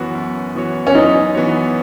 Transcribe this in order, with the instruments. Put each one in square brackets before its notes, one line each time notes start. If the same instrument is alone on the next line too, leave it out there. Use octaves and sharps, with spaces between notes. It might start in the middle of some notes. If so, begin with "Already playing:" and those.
Already playing: [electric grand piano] F#2 E3 B3 F#4 C#5
F#2
E3 B3 F#4 C#5
[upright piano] C#4
[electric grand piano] F#2 [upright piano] D#4
[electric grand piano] E3 B3 F#4 C#5